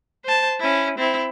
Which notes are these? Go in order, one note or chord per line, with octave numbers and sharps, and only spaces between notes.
C5 A5
C#4 E4
C4 E4